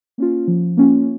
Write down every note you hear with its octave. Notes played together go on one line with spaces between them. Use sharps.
A#3 C#4 F4
F3
A#3 C#4 F4